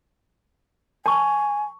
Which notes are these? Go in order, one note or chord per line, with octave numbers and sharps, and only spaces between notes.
G#5 A5 C#6